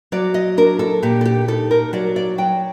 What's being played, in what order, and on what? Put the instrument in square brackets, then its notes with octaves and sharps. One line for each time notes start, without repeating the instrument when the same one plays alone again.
[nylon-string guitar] F#3 D5
D#5
D4 A#4
A4
A#2 G4
A4
G4
D#4 A4
A#4
F#3 D5
D5
F#3 G5